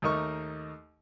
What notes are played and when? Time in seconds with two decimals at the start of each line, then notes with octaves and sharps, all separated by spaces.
0.02 D#2 A3 D#4 A#4 D#5 C#6